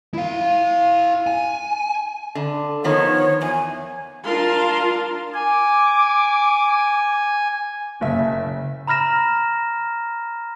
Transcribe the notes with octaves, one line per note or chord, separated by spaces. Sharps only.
E4 F5
G#5
D3
D#3 F3 B3 C#5
E2 G#5
D4 F4 A#4 F5 A5 C6
G#5 D6
F#1 C#3 E5
A#5 B5 F6 A#6 E7